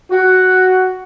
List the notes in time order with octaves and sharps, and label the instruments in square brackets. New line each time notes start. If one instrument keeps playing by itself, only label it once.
[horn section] F#4